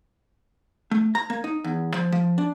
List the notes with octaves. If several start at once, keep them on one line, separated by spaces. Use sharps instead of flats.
A3
A#5
A#3
D#4
E2
F3
F3
D4